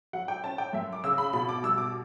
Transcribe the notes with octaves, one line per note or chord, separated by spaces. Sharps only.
F#3 F#5
G5
C#4 A5
G5
F#2 E5
D6
C#3 E6
B5
B2 B5
D6
G3 E6
D6